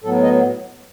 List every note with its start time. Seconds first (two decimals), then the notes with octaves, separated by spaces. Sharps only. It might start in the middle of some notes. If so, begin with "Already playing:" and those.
0.03 A2 F#3 B3 A4
0.23 D#5